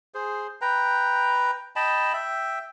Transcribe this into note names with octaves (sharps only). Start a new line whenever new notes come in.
G#4 C5
B4 G5 A#5
D#5 G5 A5 B5
E5 G5